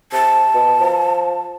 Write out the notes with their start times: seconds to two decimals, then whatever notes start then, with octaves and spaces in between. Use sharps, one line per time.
0.12 C3 A5
0.54 B2
0.80 F3